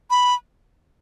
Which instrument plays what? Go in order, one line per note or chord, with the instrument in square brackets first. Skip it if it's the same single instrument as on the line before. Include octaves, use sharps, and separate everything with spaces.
[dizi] B5